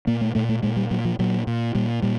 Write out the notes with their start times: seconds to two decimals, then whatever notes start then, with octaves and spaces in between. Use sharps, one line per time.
0.07 A#2 A#3
0.21 A3
0.35 A#2 A3
0.49 A3
0.63 A#2 G#3
0.77 G3
0.91 A#2 F#3
1.05 F3
1.19 A#2 F#3
1.47 A#2
1.75 A#2 G3
2.02 A#2 G3